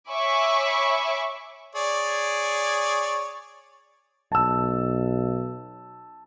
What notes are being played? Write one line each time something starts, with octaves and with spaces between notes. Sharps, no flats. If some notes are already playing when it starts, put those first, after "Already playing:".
C#5 E5 G#5 B5 C#6 D6
G#4 C#5 D5
B1 A5 E6